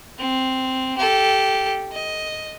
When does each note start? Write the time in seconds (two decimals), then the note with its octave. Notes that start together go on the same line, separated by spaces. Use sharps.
0.19 C4
0.98 G4 A4
1.92 D#5